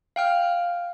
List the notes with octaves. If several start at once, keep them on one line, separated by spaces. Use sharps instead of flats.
F5 G5 F6